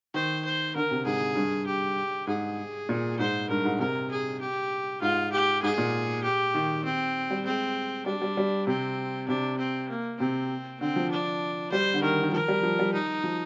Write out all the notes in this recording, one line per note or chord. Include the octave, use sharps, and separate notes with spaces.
D#3 C5
C5
D3 A#4
C3
G#2 G#4
G2
G4
G#2 G#4
A#2
G#2 C5
G2 A#4
G#2
C3 A#4
G#4
G4
G#2 F4
G4
G#2 G#4
A#2
G4
D#3
C4
G3
G#3 C4
G3 D4
G3
G3
C3 C4
C3 D4
C4
A#3
C3 C4
D3 C4
F3
D4
G3 C5
D3
D#3 A#4
D#3
F3 A#4
G3
F3
G3
D#4
F3